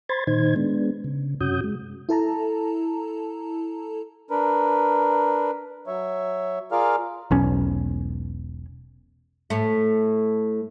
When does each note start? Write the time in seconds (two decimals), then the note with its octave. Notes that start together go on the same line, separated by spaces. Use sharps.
0.09 C5 B5 C6 G#6 A6
0.27 A#2 D#3 D#4 C5 G#6
0.56 G#3 B3 D4
1.04 C#3
1.41 F#2 C3 C#4 F#4 D#6 G6
1.64 G#3
2.09 E4 A4 A5 A#5
4.31 D4 A#4 B4
5.87 F#3 C#5 E5
6.72 F4 G#4 A#4 D5 F5 F6
7.31 E1 B1 C#4
9.50 A2 A3